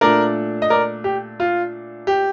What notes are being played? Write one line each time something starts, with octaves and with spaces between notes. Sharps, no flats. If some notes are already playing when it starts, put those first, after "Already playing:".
A#2 A3 D4 A#4 D5
D#5
A#4 D5
G4
F4
G4